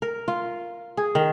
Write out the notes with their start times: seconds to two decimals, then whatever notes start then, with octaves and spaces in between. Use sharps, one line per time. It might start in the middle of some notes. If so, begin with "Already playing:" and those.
0.02 A#4
0.28 F4
0.97 G#4
1.15 D#3